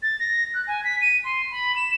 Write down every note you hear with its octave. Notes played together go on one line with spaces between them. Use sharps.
A6
A#6
F#6
G#5
B6
D#7
C6
B5
E7